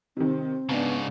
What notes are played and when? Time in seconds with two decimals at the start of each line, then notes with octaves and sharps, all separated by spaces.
0.17 C3 D#3 C4
0.69 G#2 C#3 B3 D4 A5